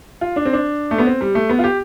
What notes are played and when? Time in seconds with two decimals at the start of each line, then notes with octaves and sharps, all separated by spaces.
0.21 F4
0.36 D4
0.45 C4
0.53 D4
0.91 A3
0.98 B3
1.06 C4
1.21 G3
1.35 A3
1.49 B3
1.59 F4
1.64 G4